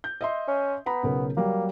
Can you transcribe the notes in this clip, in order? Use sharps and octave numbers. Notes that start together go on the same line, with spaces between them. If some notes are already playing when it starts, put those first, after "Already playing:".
G6
D#5 E5 C6
C#4
B3 A#5 B5
B1 C#3 A#4
F#3 G3 A#3